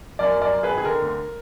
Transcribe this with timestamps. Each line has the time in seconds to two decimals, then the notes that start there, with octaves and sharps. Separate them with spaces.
0.19 F#2 A#4 D5
0.36 F#2
0.41 A#4 D5
0.53 F#2
0.63 G#4 B4
0.69 D#3
0.78 G#4
0.85 D3 A#4
1.02 D2